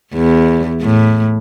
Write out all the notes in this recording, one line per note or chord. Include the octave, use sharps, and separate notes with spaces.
E2
A2